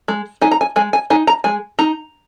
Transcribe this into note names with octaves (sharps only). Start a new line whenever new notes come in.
G#3
D#4 G#5
A#5
G#5
G#3 G#5
G#5
D#4 G#5
A#5
G#3 G#5
D#4 A#5